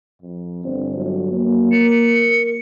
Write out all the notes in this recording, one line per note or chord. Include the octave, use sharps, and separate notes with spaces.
F2
G1 C4
F#3
A#3
A#4 C#7